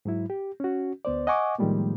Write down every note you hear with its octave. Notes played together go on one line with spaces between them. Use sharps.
G#2 F#3 E4
G4
C#4 F#4
D2 B3 C5 D5
D#5 F#5 G#5 C#6 D6
A2 D#3 F3 G3 G#3 A#3